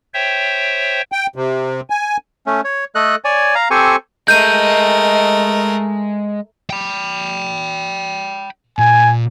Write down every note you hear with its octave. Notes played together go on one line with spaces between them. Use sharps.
C5 C#5 E5 G5
G5
C3
G#5
A3 C#4
C#5
A3 A4 D#5 F#6
C#5 D5 G#5
F5 A#5
C4 G4 A4 C5 G#5 C#6
G#3 A3 A#4 D#5 G6 D#7
G5 B5
A#2 G#5